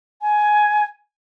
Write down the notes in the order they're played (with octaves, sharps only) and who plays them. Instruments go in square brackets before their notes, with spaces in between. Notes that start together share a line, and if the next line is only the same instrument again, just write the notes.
[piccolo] G#5